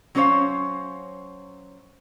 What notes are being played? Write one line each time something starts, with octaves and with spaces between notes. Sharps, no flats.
F#3 C#4 A4 C5 C#5 F5